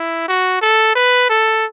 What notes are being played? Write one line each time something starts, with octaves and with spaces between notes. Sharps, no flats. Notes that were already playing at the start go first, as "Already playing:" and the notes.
Already playing: E4
F#4
A4
B4
A4